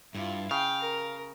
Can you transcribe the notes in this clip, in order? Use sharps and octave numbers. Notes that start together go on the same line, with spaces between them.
G2 E4 F4
C#3 F5 G5
A#4